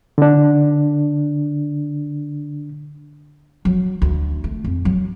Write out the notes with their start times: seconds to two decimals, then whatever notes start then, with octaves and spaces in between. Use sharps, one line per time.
0.18 D3 D4
3.65 F#3
4.02 D2
4.44 A3
4.64 F2
4.85 F#3